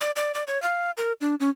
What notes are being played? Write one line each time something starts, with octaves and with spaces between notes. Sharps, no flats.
D5
D5
D5
C#5
F5
A#4
D4
C#4